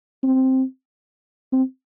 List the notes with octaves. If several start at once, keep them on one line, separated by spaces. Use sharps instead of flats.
C4
C4